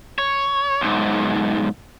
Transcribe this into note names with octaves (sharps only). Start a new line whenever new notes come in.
C#5
B1 G#2